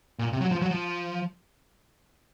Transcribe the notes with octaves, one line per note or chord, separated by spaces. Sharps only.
A#2
C3
F#3
F3
F#3
F3